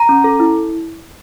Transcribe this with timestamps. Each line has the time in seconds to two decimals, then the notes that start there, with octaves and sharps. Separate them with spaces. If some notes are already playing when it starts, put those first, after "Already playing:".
Already playing: A#5
0.09 C#4
0.24 A4
0.40 E4